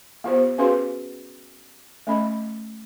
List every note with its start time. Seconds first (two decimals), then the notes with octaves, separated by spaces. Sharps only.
0.24 B3 F4 G4 C5
0.58 C#4 F#4 G#4 B4 F5 C6
2.07 A3 C#4 D#5 B5